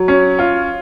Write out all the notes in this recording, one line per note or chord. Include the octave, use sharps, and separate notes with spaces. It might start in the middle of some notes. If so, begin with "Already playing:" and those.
Already playing: F#3
C#4
F4